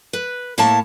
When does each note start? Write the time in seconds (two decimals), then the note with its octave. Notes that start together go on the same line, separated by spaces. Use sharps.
0.13 B4
0.58 A2 A#3 E4 C#5 A5